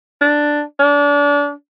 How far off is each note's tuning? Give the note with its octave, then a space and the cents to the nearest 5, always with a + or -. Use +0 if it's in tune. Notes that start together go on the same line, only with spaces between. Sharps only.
D4 +5
D4 -30